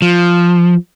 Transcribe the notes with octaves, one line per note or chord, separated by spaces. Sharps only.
F3